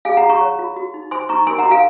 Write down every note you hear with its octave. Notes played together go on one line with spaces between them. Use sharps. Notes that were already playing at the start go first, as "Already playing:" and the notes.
G#4 F5 G#5
F#5 A#5
F4
A#5 C#6
C#5
F4
F#4
D#4
C5 G#5 C6
D#4 A#5 C#6
A#4 G#5 C6
F#5 A#5
F#4
F5 G#5